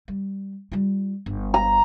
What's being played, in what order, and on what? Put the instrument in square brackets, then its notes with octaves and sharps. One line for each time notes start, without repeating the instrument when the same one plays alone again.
[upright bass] G3
G3 F4
G1
[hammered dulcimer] A#5